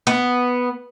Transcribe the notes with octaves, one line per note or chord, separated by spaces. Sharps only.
B3